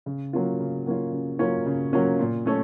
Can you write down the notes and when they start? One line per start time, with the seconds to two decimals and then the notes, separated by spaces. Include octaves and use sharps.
0.06 C#3
0.33 F#3 A#3 C#4 F4
0.60 C#3
0.87 F#3 A#3 C#4 F4
1.13 C#3
1.39 F#3 A#3 C#4 F4
1.66 C#3
1.93 F#3 A#3 C#4 F4
2.19 A#2
2.46 A3 C#4 A4